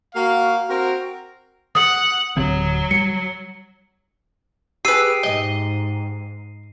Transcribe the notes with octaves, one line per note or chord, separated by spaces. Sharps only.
A#3 F#4 F5
C4 F#4 A#4
F#5 D#6
D1 D3 F#3 C4
G3 C#7
G4 G#4 B4 E6 C7 D#7
G#2 D#5